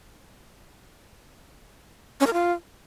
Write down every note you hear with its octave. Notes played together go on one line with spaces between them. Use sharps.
C#4
A#4
F4